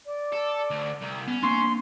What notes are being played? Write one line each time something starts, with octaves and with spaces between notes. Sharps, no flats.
D5
A4
D2
C2
B3 C#4
A#3 C4 D4 C6 C#6